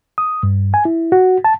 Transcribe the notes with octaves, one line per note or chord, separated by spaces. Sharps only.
D#6
G2
G#5
E4
F#4
A5